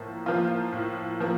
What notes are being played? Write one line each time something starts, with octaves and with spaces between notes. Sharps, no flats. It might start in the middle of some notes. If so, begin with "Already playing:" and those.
Already playing: A2 F3 A#3
F3 A#3 F4
A2
F3 A#3